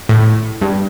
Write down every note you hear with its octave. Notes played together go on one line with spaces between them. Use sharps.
A2
G2